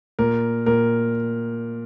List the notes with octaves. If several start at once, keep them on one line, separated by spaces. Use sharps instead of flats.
A#2 A#4
A#2 A#4